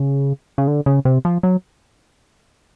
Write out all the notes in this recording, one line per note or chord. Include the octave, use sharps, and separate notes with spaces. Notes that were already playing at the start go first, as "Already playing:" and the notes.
Already playing: C#3
C#3
D3
C#3
C3
F3
F#3